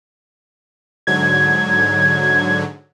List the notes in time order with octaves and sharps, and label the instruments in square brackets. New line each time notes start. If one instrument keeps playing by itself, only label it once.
[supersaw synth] G#2 D3 F#3 [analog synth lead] G#6